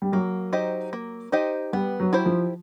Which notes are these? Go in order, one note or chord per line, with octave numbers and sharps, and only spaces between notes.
G3
F#3 A#3
D#4 G4 C5 D#5
A#3
D#4 G4 C5 D#5
G3 B3
F#3
E4 G4 C5
F3